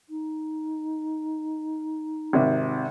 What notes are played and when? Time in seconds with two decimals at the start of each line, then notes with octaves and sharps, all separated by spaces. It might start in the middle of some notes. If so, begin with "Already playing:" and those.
0.09 D#4
2.33 G#1 C3